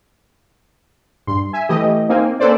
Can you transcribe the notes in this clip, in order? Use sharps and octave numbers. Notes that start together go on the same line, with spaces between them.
G2 C6
E5 G#5
E3 A3 E4 G4 D#5
A#3 C4 D#4 G#5
A#3 C#4 A4 B4 C5 D5